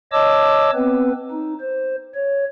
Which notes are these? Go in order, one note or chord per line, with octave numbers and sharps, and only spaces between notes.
C#5 D#5 A5 D6 E6
B3 C4 B4
D#4
C5
C#5